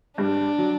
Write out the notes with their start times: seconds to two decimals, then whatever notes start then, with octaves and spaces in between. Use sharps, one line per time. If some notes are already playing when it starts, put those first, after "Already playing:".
0.18 G2 G3 D4
0.58 F#3